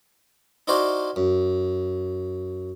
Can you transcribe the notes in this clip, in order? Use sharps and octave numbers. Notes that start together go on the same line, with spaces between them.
D#4 E4 F#4 C5 D5 F5
F#2